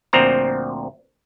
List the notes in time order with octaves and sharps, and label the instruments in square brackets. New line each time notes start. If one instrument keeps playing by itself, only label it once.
[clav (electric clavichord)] D2 A#2 F3 C4 A#5